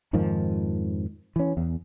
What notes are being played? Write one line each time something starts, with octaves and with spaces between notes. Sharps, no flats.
F2 G#2 D#3 F3
E3 C#4
E2